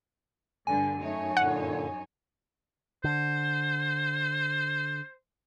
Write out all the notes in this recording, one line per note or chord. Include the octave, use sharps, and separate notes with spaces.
G2 D3 G#5
F#2 A3 D#4 C#5
A#2 D3 F#5
D3 C5